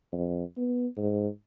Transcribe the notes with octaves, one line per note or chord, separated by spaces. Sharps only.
F2
B3
G#2